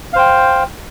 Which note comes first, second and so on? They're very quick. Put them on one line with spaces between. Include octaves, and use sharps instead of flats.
F5 C5 G5